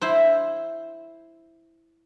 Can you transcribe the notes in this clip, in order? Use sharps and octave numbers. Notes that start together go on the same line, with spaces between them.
E4 C5